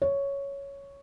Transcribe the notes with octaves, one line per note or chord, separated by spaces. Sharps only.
C#5